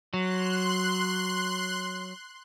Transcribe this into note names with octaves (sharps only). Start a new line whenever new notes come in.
F#3 C6 F#6